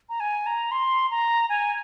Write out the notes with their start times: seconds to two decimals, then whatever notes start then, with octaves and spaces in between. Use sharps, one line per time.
0.09 A#5
0.20 G#5
0.46 A#5
0.72 C6
1.11 A#5
1.49 G#5